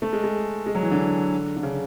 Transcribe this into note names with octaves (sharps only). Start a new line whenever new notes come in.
A3
G#3
G#3
G#3
F#3
E3
D3
D3
C#3